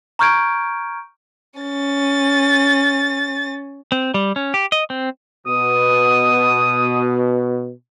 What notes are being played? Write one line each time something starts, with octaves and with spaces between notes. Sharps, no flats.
A#5 C#6 F6 G6 G#6 D7
C#4 A6
C4
G3
C#4
G4
D#5
C4
B2 D#6